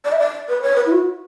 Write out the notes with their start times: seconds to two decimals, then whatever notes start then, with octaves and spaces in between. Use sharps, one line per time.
0.05 D5
0.12 E5
0.20 D5
0.49 B4
0.62 C#5
0.76 B4
0.86 E4
0.92 F#4